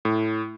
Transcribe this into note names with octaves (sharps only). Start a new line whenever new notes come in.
A2